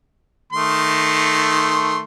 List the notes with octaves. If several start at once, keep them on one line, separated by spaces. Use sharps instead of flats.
D#3 A3 C6